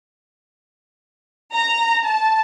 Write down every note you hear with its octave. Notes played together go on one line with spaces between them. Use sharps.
A#5
A5